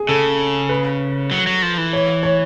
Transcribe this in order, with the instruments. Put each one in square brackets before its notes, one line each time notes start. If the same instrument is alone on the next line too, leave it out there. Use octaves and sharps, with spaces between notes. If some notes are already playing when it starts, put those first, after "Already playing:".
Already playing: [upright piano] G#4
[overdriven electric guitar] C#3 [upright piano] A4
[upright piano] B4
[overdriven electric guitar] F#3
F#3
F3
E3
[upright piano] C#5
C#5